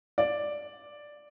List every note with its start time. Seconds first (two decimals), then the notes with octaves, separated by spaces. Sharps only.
0.18 D5